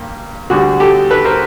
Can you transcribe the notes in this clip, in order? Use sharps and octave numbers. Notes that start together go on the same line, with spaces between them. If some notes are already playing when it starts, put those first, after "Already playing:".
Already playing: G2 A#3
D2 D3 G3 F#4 G#4
G4 A4
A4 B4
A#4 C5